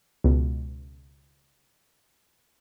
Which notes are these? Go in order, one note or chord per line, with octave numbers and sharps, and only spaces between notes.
C#2 B2